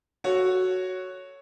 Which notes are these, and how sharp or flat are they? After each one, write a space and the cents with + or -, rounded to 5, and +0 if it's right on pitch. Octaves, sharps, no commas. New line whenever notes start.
F#4 +0 A4 +0 C#5 +0